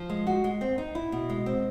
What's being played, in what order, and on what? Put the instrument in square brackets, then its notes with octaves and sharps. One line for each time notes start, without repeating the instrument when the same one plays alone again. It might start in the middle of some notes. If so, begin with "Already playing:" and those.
Already playing: [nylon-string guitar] F3
G#3
F#4
G#3
C4
D#4
E4
B2
G#3
C4